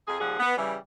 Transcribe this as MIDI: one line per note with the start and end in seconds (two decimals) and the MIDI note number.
0.08 0.20 41
0.08 0.20 68
0.21 0.38 39
0.21 0.38 53
0.21 0.38 55
0.21 0.38 68
0.21 0.38 78
0.40 0.52 59
0.57 0.74 49
0.57 0.74 52
0.57 0.74 55